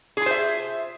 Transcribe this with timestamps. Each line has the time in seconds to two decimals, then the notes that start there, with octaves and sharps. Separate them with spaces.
0.17 G#4
0.22 F4
0.26 C5
0.31 E5